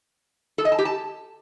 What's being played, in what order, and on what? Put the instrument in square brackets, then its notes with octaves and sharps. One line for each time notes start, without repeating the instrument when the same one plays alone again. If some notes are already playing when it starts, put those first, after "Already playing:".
[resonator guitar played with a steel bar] A4
D#5
A5
G4
A5